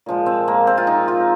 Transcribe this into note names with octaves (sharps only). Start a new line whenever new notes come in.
A#2 F3 G#3
C4
A#3
C4
F4
D#4
F4